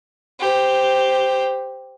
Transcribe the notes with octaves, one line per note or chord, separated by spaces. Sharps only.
G4 C5